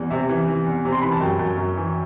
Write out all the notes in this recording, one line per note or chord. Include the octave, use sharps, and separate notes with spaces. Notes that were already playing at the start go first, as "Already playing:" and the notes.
Already playing: E2 E3 G3
C3 E5
E3
E3
E2
C3
C6
E3 B5
A5
F#2 G5
F#2
F#2
E3